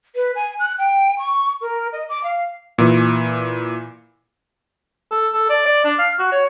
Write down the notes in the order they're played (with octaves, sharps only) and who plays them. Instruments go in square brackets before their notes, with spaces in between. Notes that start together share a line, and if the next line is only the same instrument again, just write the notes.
[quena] B4
G#5
F#6
G5
C#6
A#4
D#5
D6
F5
[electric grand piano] A#2 E3
[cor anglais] A4
A4
D5
D5
D4
F5
F#4
C#5